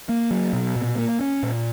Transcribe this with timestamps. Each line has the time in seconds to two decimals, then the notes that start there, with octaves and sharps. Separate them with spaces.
0.09 A#3
0.31 F#3
0.53 B2
0.76 A#2
0.98 A#3
1.20 C#4
1.43 A#2